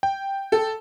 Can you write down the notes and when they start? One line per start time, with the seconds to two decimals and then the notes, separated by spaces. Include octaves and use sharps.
0.03 G5
0.52 A4